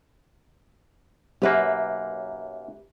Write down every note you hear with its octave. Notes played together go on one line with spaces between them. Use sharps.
B1 F#2 A#3 G4 B4 E5